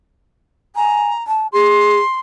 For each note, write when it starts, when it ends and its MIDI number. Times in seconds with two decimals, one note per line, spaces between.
0.76 1.10 80
0.76 1.23 82
1.27 1.47 81
1.53 1.99 68
1.53 2.20 84